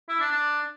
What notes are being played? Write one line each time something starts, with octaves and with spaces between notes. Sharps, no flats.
E4
D4
D4